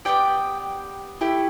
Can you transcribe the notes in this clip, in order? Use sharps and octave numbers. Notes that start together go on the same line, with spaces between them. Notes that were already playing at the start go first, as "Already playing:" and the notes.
B3 D4 G4 D5 G5
A3 E4 G4